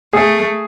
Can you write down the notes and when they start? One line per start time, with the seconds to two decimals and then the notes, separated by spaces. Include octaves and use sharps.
0.13 A3 G#4